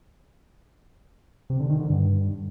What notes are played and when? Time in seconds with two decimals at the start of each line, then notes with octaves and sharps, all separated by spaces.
1.50 C3
1.60 D3
1.70 D#3
1.79 D3
1.89 G2